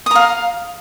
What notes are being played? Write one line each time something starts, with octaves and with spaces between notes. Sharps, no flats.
F5 A#5 D#6